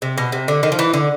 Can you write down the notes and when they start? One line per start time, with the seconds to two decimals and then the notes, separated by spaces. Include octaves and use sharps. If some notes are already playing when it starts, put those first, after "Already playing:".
0.02 C3
0.18 B2
0.32 C3
0.48 D3
0.63 D#3
0.72 F3
0.79 E3
0.93 D3